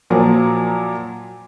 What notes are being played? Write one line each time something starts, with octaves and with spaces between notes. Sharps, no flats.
A#2 F3 F#3 A#3